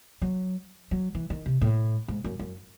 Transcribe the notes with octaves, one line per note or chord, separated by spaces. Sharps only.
F#3
F#3
E3
D#3
C3
A2
G#2
F#2
F#2